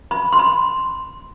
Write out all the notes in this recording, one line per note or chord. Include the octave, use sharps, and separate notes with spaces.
B5
C6
B5